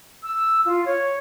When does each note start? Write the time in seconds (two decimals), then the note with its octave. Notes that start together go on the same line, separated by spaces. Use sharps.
0.23 E6
0.65 F4
0.86 C#5